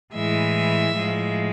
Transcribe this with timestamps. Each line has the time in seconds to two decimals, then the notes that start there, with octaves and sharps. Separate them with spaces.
0.14 A2 E3 G#3 E5
0.97 A2 F3 G#3